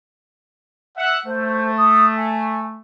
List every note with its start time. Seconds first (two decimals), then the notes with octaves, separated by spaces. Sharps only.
0.97 E5 F#5
1.26 A3 C5
1.78 D#6
2.17 G#5